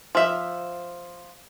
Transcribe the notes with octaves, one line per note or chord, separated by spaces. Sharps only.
F3 E5